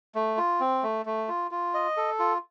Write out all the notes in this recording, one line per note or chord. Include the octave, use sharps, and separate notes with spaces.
A3
F4
C4
A3
A3
F4
F4
D#5
A4
F4